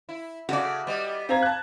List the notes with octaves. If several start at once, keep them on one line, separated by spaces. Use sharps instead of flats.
E4
C#3 A3 F#4 D5
G3 B3 D#5
C4 F5 A#5 G#6
A5 F#6